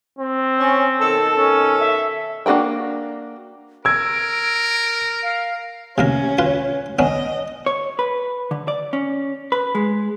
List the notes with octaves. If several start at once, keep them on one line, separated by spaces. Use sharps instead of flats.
C4
C#4
B2 D#3 A4
C#4
E5
A#3 D4 F#4 A#4 G5
A#4 E6 G#6 D7
F5
C3 A#3 C#4 A#4
F4 B4
B3 C#4 D4 D#5
C#5
B4
D3
D5
C#4
B4
G#3